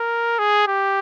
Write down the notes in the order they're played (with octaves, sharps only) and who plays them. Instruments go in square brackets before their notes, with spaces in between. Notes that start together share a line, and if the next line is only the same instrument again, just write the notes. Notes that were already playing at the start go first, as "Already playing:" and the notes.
Already playing: [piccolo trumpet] A#4
G#4
G4